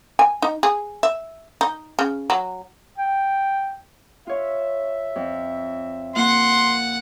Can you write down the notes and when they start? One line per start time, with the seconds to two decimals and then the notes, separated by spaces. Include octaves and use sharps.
0.19 G#5
0.42 D#4
0.63 G#4
1.03 E5
1.61 D#4
1.99 C#3
2.30 F#3
2.98 G5
4.27 F4 C#5 E5
5.16 F2
6.16 A#3 F4 F#5 C6